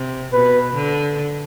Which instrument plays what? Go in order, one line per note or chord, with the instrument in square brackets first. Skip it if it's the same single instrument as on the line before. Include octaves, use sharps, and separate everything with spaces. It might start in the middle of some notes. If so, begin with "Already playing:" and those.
Already playing: [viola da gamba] C3
[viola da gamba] B2 [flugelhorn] B4
[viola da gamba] D3